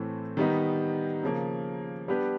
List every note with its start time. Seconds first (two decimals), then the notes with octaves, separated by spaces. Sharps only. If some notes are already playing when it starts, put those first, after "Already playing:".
Already playing: A2 E3 A3 C4
0.37 D#3 G3 B3 D#4
1.23 C#3 F3 A#3
2.08 G3 B3 D4 G4 B4